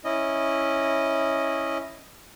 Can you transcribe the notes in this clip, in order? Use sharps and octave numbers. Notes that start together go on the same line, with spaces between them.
C#4 E4 D#5